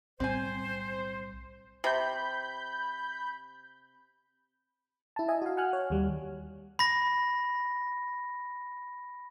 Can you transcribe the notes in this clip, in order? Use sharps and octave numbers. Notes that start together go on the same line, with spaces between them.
B1 A2 G3 C4 C5 G#5
C3 B5 G6
E4 A5
D#5 E5 G#5
F#4 F5
F#5 G#5 F6 F#6
C#5
D#2 G3
B5 A#6